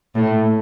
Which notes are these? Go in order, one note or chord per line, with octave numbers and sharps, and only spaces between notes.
A2